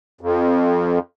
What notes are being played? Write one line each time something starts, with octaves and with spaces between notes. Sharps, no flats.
F2